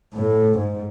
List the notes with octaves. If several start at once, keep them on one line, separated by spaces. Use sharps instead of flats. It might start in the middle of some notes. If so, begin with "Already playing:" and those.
A2
G#2